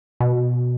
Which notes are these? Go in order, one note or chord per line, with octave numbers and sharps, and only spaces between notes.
B2